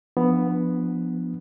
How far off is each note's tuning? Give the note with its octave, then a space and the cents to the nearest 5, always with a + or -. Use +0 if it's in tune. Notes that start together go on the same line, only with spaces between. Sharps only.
F3 +0 B3 +0 D4 +20